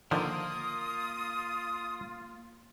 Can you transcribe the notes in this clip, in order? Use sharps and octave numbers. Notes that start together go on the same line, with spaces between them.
D3 D#3 F3 A#3 F4 A#4 D#6